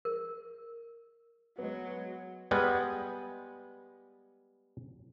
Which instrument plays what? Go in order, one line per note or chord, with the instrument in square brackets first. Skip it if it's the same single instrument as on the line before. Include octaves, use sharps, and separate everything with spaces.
[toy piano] A#4
[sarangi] F#3 [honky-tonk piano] G#3 B3
[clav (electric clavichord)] G3 G#3 B3 B4